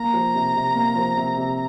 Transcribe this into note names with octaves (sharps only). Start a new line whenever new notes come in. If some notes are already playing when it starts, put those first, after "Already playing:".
Already playing: A#3 A#5
F3
C3
C3
A#3
F3
C3
C3